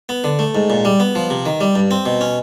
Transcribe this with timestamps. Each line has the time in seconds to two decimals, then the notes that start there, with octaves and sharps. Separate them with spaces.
0.09 B3
0.24 D3
0.39 A3
0.55 G#2
0.70 A#2
0.85 G3
1.00 B3
1.15 F3
1.30 C3
1.46 D#3
1.61 G3
1.75 G2
1.91 C4
2.06 B2
2.21 C#4